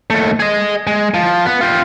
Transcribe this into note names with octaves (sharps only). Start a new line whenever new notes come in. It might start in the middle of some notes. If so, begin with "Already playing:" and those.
D#2 A3
G#4 D#5
G#3
F3
B3
F4 G4